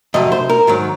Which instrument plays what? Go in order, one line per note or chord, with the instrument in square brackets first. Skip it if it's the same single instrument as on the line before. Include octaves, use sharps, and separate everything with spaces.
[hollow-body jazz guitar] F2 C3 F#3 D#5
C5
A#4
G#2 D#3 F#3